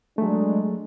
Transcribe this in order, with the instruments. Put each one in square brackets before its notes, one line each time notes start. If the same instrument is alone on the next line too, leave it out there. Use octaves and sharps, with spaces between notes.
[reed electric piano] F#3 A3 [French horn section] G#3 D4